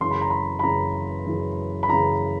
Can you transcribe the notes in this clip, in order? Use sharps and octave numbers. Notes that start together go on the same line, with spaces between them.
F#2 C#3 E3 C6
B5
A#5
B5
B5
F#2 C#3 E3 A#5
F#2 C#3 E3
B5
F#2 C#3 E3 A#5